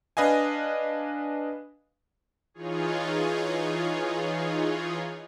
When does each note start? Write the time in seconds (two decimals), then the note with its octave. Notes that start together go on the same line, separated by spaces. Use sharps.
0.17 D4 B4 D#5 F5 G#5
2.54 E3 D#4 F4 G#4 C#5